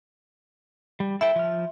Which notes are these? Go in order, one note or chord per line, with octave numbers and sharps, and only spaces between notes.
G3
E4 A4 E5 G5
F3 F6